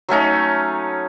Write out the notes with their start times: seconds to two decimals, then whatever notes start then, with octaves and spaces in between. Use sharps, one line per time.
0.09 F#3 A3 C#4 D#4